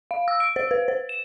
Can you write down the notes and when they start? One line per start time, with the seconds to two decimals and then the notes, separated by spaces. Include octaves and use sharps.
0.11 F5
0.28 E6
0.40 D7
0.56 C5
0.71 B4
0.88 C5
1.09 E7